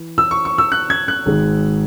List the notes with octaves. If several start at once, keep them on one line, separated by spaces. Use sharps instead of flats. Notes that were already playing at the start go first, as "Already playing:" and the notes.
Already playing: E3
E6
C#6
C#6
E6
F#6
G#6
F#6
G#1 G#2 G#3